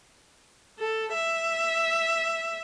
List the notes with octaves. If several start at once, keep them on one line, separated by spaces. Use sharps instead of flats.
A4
E5